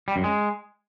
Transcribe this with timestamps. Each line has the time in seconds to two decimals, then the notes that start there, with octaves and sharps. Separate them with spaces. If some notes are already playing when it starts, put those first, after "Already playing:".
0.08 G3
0.16 F#2
0.24 G#3